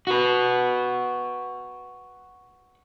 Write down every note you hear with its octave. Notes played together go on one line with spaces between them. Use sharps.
F#4 B4